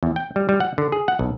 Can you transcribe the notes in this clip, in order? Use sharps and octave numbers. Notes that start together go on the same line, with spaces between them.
E2
G5
G3
G3
F#5
D3
G#4
F#5
B1